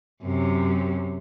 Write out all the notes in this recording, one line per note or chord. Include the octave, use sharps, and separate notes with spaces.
F#2 C3